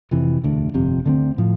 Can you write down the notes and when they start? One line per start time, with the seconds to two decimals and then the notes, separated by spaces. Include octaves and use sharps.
0.11 F1 F2 C3 E3
0.43 E1 D2 D3
0.74 G1 F2 C3
1.05 D2 D3 A3 C4
1.38 A2 F3